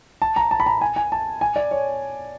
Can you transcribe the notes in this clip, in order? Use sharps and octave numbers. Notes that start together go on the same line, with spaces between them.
A5
A#5
A5
B5
A#5
G#5
G#5
A5
G#5
D5
C#5